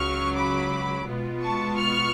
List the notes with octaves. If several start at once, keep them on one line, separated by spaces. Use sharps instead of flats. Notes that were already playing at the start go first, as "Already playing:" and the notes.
Already playing: C#2 C#3 F#3 C#6 F6
B5 D6
B2 G#3 B3 F4
A5 C#6
C#6 F6